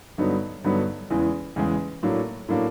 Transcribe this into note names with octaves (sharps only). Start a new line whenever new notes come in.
G2 D3 F#3 B3 D#4
G2 D3 F#3 B3 D#4
E2 C#3 E3 G#3
E2 C#3 E3 G#3
A2 F#3 A#3 D4
A2 F#3 A#3 D4